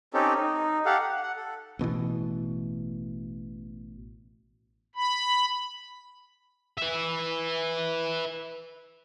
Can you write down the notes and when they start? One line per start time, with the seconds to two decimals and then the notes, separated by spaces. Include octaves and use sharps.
0.14 C4 C#4 D#4 G4 A4
0.35 D#4
0.86 G4 A4 F5 F#5
1.01 F#5
1.23 F#5
1.36 A4
1.79 A1 B2 D3 E3
4.95 B5
6.78 B4 E5